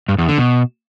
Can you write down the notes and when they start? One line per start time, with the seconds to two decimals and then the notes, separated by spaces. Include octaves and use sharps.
0.09 G2
0.18 E2
0.28 D3
0.38 B2